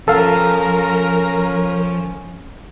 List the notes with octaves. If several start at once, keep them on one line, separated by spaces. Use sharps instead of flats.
F3 C#4 A4 A#4 F5